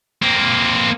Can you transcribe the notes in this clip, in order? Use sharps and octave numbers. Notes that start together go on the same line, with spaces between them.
A#3 C4